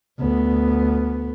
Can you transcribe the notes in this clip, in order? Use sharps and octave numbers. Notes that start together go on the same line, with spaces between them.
D2 B3